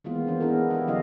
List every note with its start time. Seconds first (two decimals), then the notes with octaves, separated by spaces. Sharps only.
0.04 D#3 E3 G#3 A#3 B3 F4
0.27 E3 B3 D4 C5
0.40 B3 D4 E4 G#4 A#4
0.70 E4 F4 G4
0.87 D3 F#3 C#4 E4 D#5 F5